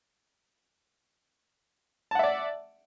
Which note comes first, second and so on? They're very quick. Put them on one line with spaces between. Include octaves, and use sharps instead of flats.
A5 F#5 E5 D5